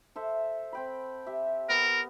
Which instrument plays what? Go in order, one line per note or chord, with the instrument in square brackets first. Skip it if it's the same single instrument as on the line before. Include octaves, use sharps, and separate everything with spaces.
[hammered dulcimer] A4 C5 E5
C4 G5 B5
G4 E5
[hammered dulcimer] B3 [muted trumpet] A#4